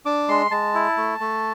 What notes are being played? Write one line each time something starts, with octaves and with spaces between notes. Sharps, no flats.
D4 D6
G#3 C6
G#3 A5
E4
A3
A3